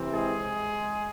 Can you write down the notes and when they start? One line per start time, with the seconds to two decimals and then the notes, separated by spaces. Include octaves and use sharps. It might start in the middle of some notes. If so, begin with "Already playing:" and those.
Already playing: C3 E3 C4
0.12 G#3 G#4